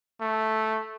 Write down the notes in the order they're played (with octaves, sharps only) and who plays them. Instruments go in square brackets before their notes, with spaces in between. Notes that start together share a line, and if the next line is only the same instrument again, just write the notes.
[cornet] A3